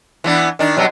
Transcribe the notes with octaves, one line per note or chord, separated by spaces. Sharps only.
E3 B3 D4
D#3 D4
B2 F#3 G3